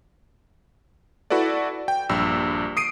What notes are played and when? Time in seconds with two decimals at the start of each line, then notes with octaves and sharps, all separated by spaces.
1.30 E4 F#4 A4 B4 D5
1.88 G5
2.09 A#1 G2 E6
2.77 D#6 C7 D7 D#7